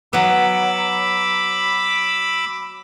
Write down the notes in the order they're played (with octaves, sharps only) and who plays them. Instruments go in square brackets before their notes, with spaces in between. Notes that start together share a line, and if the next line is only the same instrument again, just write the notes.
[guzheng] F#3 B3 [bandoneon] B5 D6 E6